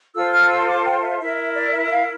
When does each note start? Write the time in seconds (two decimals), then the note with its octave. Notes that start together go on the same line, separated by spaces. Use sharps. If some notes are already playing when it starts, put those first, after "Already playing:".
0.15 F4 A4 C5 E6
0.33 F6
0.50 E6
0.67 D6
0.86 G5
1.03 E5
1.20 E4 A#4 E5
1.37 E5
1.55 D5
1.73 E5
1.87 E5
1.90 F5